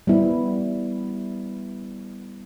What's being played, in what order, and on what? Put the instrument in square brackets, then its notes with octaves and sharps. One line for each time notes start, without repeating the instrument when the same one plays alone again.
[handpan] G3 B3 E4